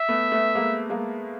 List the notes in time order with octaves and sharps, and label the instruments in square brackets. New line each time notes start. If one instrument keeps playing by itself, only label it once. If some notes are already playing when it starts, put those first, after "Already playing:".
Already playing: [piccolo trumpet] E5
[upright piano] A3 B3
A3 B3
G#3 A#3
G#3 A#3